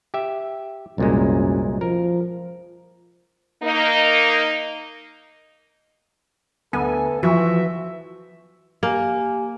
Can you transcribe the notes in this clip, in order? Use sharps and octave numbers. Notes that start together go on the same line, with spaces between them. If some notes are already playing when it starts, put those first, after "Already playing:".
G4 E5
C2 F#2 A#2 G#3
F3 A#4
A#3 D#4
D2 B3 A4 G#5
E3 F3 F#4 E5
A#3 G4 G#5